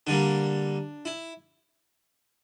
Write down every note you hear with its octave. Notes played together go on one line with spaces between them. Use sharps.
D3 G3 A#3 D4
E4